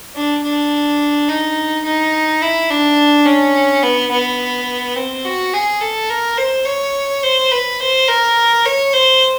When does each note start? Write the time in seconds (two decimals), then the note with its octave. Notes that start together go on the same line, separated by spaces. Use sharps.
0.15 D4
0.44 D4
1.29 D#4
1.85 D#4
2.42 E4
2.70 D4
3.26 C#4
3.83 B3
4.11 B3
4.96 C4
5.25 F#4
5.54 G#4
5.81 A4
6.10 A#4
6.37 C5
6.66 C#5
7.23 C5
7.51 B4
7.80 C5
8.08 A#4
8.65 C#5
8.93 C5